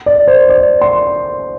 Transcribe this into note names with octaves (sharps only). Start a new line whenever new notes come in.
D5
C5
D5
C6